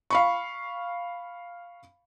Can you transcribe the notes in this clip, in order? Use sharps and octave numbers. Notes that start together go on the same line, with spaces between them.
F5 B5 C#6